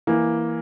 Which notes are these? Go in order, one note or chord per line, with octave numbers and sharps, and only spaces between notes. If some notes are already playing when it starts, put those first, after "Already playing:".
E3 A#3